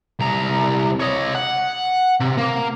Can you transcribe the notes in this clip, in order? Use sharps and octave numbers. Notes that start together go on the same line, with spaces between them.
C2 A#5
C#5 D#5
F#5
C3
A#3